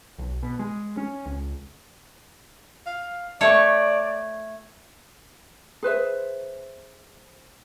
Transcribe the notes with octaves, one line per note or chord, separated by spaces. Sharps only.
B1
B2
G#3
C#4
C#2
F5
A3 C#5 D5
G#4 B4 C5 E5